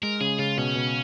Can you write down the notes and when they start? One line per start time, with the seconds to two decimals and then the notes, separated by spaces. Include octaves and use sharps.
0.02 G#3 A#4
0.20 C#3 G#4
0.39 C#3 F4
0.57 B2 C#4
0.75 B2